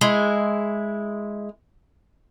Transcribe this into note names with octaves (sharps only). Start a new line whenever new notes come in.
G#3 E4